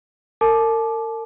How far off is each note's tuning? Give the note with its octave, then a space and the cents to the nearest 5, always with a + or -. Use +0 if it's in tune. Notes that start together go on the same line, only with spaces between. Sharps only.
A#4 -40 A5 -35 D6 +10